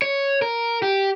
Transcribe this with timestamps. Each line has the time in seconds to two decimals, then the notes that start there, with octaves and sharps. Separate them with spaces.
0.02 C#5
0.42 A#4
0.82 G4